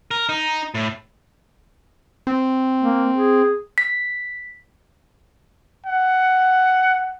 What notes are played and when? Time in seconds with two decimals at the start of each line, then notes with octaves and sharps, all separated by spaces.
0.11 A#4
0.29 D#4
0.75 A2
2.27 C4
2.83 A#3
3.16 G#4
3.78 B6
5.86 F#5